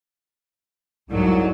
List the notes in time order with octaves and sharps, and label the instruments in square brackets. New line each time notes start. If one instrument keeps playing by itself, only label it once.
[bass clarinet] C2 [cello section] F2 G#2 F#3